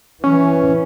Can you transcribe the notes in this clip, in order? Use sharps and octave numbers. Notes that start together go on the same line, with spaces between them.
E3 C#4